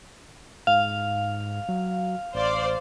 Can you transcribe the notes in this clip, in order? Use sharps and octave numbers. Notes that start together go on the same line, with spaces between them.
G#2 F5
F#3
A1 C5 D5 F5